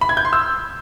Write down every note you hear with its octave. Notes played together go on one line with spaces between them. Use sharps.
B5
G#6
G6
C6
E6